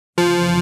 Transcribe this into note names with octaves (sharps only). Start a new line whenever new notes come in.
F1 F2 C#3 E3 F3